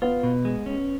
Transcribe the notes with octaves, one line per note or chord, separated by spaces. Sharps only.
B3 F4
B2
G#3
C#4